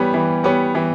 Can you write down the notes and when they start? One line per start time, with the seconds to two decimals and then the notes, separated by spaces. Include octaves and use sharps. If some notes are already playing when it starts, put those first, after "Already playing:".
Already playing: E3 G3 B3 G4 C#5
0.14 E3
0.44 G3 B3 G4 C#5
0.75 E3